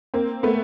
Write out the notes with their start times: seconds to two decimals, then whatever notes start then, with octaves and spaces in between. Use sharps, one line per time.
0.14 A#3 C4
0.43 A3 B3